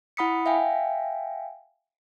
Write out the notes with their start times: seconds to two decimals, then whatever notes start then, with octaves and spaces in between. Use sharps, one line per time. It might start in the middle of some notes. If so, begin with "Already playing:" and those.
0.17 E4 F#5 B5 D#6 B6 C#7
0.46 E5 F5 G5 G#5